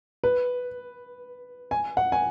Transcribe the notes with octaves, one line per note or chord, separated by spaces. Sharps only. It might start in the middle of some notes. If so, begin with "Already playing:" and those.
B4
G#5
F#5
G#5